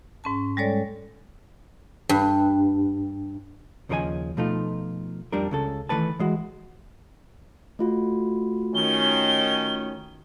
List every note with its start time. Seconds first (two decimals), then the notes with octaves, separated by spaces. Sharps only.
0.24 G#2 C#4 A5
0.57 G3 G#3 A4 C#5 D5
2.09 G2
3.89 D#2 C#3 F3 A#4 D#5 G#5
4.37 B2 F3 A3 D#4 F4
5.32 F2 G3 D4 A#4
5.51 C#2 C#3 A4
5.89 D#3 E3 A3 B4 A5
6.19 E3 G#3 F#4
7.79 A3 F4 F#4
8.75 D#3 C#4 G7